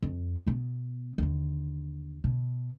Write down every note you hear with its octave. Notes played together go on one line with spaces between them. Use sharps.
F2
B2 B3
D#2 D3
B2